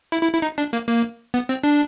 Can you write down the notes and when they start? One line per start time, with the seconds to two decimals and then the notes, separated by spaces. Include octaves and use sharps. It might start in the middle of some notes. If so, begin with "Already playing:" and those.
0.12 E4
0.23 E4
0.33 E4
0.42 D#4
0.58 D4
0.73 A#3
0.88 A#3
1.34 B3
1.49 C4
1.63 D4